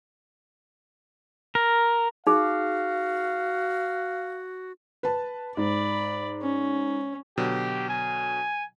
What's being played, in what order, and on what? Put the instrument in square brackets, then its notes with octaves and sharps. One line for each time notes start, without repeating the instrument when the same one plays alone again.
[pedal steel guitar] A#4
[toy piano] D#4 G#4 [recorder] F#4 [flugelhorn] F5
[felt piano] B4 A5
[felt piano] G#2 [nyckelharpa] D5 B5
[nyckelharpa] C#4
[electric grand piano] B2 D3 F#3 [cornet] G4
[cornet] G#5